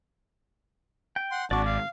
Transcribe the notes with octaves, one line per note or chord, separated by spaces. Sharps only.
G5
F#5 C6
G#1 D4 F#4 D5 D6
F5